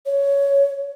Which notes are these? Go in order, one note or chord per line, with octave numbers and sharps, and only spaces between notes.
C#5